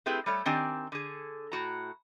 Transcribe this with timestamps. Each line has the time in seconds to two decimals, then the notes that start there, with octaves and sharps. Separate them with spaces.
0.06 A3 C4 E4 G4 G#4 B4
0.26 G3 A3 C#5
0.45 D#3 C4 D4 G4 G#5
0.92 D3 G#4
1.52 A2 F#4 A#5